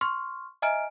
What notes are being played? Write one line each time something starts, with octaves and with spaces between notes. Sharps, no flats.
C6 C#6 F6
D#5 E5 G#5 A#5 F6 D7